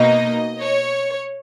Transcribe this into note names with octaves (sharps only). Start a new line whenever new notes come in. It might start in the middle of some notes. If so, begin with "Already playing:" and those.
Already playing: B2 A#3 D#4 D#5
C#5